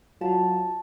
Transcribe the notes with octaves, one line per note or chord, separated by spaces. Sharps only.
F#3 F4 F#4 A5